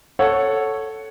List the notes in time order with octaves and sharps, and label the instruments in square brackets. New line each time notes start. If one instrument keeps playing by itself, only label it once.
[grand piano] A4 C#5 F#5